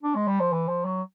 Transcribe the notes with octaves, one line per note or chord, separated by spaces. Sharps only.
D4
G#3
G3
F3
E3
F3
F#3